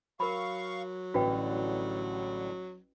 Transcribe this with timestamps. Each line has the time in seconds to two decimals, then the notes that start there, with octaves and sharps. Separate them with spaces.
0.20 F#3 A#4 F5 B5 C#6
1.14 A1 A2 D3 G3 F#4 B4 G5